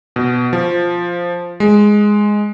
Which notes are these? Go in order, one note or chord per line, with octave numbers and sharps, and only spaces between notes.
B2
F3
G#3